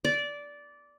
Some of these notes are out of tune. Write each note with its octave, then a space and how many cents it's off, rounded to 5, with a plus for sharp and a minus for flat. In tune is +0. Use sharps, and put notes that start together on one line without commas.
D5 -15